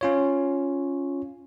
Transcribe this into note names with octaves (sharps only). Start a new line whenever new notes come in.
C#4 F4 C#5